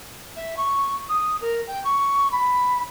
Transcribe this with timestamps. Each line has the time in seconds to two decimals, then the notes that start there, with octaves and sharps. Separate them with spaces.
0.36 E5
0.56 C#6
1.09 D#6
1.41 A#4
1.67 G5
1.84 C#6
2.31 B5